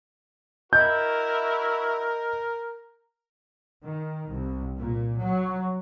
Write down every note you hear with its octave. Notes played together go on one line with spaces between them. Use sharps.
E4 F#4 A#4 D#5 E5 G6 G#6
D#3
C2
A#2
F#3